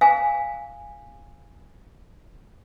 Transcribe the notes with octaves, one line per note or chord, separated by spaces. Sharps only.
F5 G#5